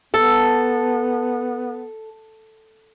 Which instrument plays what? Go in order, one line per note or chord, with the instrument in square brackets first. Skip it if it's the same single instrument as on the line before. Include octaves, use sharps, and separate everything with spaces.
[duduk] B3 [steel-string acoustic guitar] A4